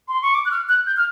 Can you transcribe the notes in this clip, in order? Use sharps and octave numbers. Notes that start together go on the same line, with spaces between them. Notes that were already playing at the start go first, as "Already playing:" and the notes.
C6
C#6
D6
F#6
F6
F#6
G6
F6